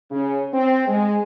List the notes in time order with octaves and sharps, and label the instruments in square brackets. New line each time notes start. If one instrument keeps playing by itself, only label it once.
[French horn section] C#3
C4
G#3